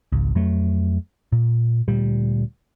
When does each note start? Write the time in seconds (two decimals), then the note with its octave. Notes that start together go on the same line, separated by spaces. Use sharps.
0.12 G#1 C#2
0.35 F2 F#3 A3
1.32 A#2
1.88 D2 A#2 G3